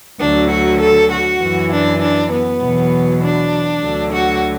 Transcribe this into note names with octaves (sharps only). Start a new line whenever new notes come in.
D2 D3 F#3 D4
F#4
A4
F#4
F#2 E3
D4
D4
B3
E2 B2 F#3
D4
D2 D3 F#3
F#4